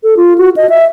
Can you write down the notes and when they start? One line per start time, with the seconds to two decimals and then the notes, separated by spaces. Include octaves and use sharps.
0.03 A4
0.17 F4
0.38 F#4
0.57 D#5
0.69 E5